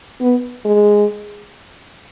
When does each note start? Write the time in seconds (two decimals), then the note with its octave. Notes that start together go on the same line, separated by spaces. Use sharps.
0.20 B3
0.65 G#3